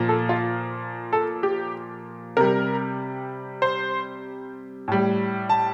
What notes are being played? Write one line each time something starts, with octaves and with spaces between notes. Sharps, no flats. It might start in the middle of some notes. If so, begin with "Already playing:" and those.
Already playing: A#2 F3
A4
F4
A4
G4
C3 G3 A#4
C5
A2 G3
A5